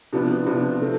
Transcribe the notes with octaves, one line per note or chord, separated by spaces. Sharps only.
C3 F3 B3 D4 F4
C3 F3 B3 D4 F4
F3 A3 C4